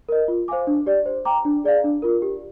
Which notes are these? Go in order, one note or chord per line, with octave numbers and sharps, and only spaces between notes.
A#4 D#5
F4
C5 F5 G#5 D6
D4
G4 D5
C5
G5 A#5 D6
D4
G#4 D5 F5
D4
F4 A#4
G4